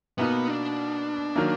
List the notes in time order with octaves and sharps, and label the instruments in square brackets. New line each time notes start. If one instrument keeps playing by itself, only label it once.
[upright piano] B2 A#3 D#4 F#4 [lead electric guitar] B3
[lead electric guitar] D4
[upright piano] D#3 F#3 A#3